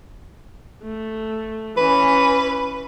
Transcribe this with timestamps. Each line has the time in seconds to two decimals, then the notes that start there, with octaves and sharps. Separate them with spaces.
0.83 A3
1.77 E3 C#4 B4